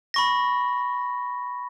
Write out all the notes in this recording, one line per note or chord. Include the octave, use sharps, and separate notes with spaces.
B5 C#6 A#6